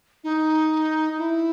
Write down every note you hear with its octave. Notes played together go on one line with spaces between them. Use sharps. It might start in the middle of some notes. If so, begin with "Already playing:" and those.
D#4
E4